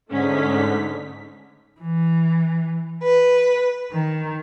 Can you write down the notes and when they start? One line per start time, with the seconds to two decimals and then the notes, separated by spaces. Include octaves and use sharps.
0.10 G#2 D3 A3 C#4 D#4 B6
1.81 E3
3.03 B4
3.92 D#3